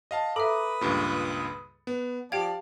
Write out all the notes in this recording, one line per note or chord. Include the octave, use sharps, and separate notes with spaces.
D#5 F5 A5
A4 B4 E5 A#5 B5 D6 D#6
C#2 G2 A#2
B3
F3 G4 D5 F5 G5 A5 G#6